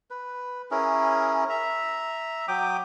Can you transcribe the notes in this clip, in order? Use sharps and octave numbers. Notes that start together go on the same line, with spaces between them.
B4
C#4 E4 G#4 A#4
E5 A#5
F#3 G5 D6 D#6